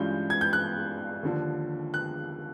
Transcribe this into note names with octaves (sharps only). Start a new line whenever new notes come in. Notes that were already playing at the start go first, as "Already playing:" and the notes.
Already playing: G2 E3 G#3 C#4 F4 G6
G#6
G6
F#6
D#2 D3 F3
F#6